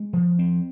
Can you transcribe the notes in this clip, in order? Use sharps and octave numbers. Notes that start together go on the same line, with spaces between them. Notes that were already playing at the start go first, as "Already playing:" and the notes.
Already playing: G#3
F3
C4